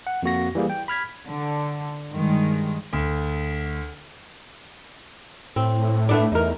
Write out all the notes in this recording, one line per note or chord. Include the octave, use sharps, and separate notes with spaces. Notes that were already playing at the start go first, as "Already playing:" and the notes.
F#5
F2 A#3 F#4 A#6
E3 G3 A#3 G#4
G5
B5 F6 G#6 B6
D3
G2 D#3 G#3
D2
A2 C4
A3 B3 D4
E2 D#4 A#4